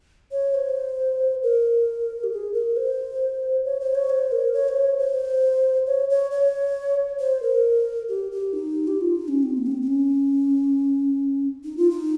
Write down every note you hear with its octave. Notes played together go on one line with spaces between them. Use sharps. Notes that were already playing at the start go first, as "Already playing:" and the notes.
C#5
C5
A#4
G4
G#4
A#4
C5
C#5
C5
C#5
C5
A#4
C#5
C5
C#5
C5
C#5
C#5
C#5
C5
A#4
G4
G4
D#4
G4
F4
D#4
C#4
C4
A#3
C#4
C4
C4
C#4
D#4
F4
D#4